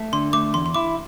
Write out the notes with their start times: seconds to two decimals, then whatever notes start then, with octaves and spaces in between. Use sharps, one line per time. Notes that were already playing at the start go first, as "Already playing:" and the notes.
Already playing: A3
0.13 D3 C6
0.33 A3 D6
0.54 E2 C6
0.66 C6
0.74 E4 D6